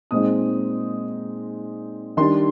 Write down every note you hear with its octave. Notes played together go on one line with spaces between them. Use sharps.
A#2 G#3 C4 D#4 D#6
D#3 G3 D4 C6